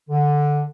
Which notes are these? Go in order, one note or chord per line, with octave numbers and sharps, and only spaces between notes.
D3